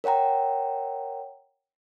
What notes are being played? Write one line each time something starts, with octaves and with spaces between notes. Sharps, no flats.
A#4 C#5 F#5 G5 A#5